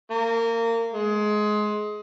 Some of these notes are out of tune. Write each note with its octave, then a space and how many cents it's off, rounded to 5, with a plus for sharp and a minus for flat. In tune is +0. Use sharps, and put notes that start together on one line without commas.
A#3 -25
G#3 +20